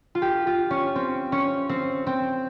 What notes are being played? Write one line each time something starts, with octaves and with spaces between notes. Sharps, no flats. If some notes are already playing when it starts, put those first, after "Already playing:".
F4
G4
F4
C#4
C4
C#4
C4
C4